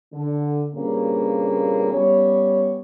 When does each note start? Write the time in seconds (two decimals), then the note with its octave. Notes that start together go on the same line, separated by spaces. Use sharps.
0.13 D3
0.74 G2 A#2 C#3 A#3 C4 C#4
1.92 G3 B3 C#4 C#5